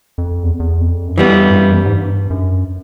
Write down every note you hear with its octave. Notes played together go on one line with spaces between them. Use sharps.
F2
E2
E2
F2
F#2
F2 E3 G3 B3
G2
F#2
G#2
G2
F#2